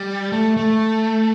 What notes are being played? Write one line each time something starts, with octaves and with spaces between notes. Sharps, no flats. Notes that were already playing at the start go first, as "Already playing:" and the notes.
Already playing: G3
A3
A3